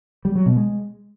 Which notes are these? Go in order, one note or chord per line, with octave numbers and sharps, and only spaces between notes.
G3
F#3
B2
G#3